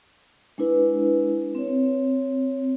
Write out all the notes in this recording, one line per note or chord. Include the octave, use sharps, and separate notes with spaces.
G#3 D4 E4 B4
C4 C#5